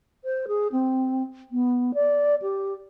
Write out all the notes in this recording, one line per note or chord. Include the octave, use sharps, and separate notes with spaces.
C5
G#4
C4
B3
D5
G4